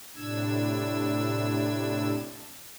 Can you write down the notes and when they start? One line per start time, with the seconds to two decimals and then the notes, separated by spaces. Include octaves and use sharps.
0.15 A2 C3 D4 E6 G#6